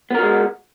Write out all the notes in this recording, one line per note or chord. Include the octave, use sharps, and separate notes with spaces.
G#3 B3 F#4 A#4